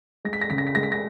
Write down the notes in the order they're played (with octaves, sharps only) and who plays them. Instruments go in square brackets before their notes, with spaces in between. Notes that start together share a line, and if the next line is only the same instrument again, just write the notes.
[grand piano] G#3 [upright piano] A#6
[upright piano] B6
A#6
[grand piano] C#3 [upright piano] B6
[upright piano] A#6
B6
[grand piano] G#3 [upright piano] A#6
[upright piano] B6
A#6